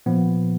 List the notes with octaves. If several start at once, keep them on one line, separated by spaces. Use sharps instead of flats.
A#2 F3 B3